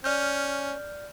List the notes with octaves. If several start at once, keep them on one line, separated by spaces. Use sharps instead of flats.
C#4 D5 F6 G6